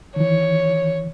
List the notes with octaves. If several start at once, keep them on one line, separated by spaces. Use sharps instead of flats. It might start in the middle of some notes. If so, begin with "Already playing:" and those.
D#3 E3 C#5